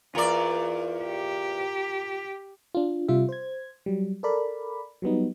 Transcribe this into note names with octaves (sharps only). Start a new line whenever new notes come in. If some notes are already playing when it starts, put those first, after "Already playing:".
E2 F4 A#4 D5
G4
D4 F4
C3 G3 F4 E5
C5 G#6
F#3 G3
A4 A#4 D5 B5
F#3 G3 B3 D#4